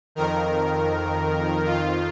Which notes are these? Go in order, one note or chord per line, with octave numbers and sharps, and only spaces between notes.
F2 D#3 A#4
F2 D#3 F4